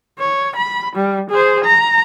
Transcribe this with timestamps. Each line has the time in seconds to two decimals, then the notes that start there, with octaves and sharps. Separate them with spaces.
0.19 C#5
0.56 B5
0.95 G3
1.30 G#4 C5
1.64 A#5